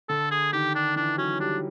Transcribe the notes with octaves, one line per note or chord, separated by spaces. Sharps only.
D3 A4
G#4
D#3 G4
D4
E3 D4
F#3 C#4
G3 D4